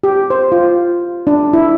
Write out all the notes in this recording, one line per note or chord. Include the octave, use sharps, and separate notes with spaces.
G4
C5
F4
D4
E4